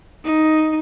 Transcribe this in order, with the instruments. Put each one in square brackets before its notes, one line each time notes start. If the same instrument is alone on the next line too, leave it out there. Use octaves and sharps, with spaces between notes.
[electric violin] D#4